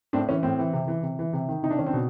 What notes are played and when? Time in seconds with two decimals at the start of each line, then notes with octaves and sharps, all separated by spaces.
0.13 A2 C4 D4
0.29 E3 C#4
0.43 A2 C4
0.59 E3
0.73 C3
0.88 E3
1.03 C3
1.19 E3
1.33 C3
1.48 D#3
1.63 C3 D#4
1.70 D4
1.79 D#3 C#4
1.86 C4 D4
1.93 B2